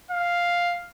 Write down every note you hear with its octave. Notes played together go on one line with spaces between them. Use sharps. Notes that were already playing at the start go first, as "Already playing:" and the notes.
F5